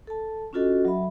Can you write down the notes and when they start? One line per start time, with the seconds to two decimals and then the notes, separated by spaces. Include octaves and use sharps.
0.07 A4 A5
0.53 C#4 D4 F4 F#4 A4 D#5
0.85 F#3 E5 B5